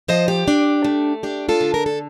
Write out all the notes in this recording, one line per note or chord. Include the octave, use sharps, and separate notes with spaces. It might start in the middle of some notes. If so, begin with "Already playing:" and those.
F3 C5 D#5
G4
D4
A3
D4 G4
F4 A4
D3
A#4
A4